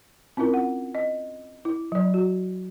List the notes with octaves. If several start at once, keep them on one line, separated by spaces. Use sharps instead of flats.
C4 C#4 E4 F4 A#4
F#5
D#5
E4
F#3 D5
F#4